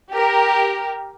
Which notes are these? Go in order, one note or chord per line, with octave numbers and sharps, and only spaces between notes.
G4 A#4